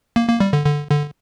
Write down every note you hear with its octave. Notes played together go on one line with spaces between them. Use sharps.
A#3
A#3
G3
D3
D3
D3